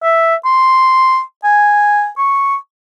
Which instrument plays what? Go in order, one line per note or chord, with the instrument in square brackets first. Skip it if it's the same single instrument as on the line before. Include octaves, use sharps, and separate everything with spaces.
[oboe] E5
C6
G#5
C#6